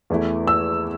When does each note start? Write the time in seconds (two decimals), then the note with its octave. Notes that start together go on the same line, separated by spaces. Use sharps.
0.10 E2 E3 A3 E4
0.48 E6